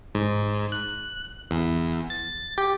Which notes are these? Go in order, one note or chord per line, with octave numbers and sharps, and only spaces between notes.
G#2
F#6
E2
A6
G4